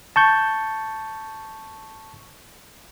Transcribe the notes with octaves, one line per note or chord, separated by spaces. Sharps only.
A5 C#6 G6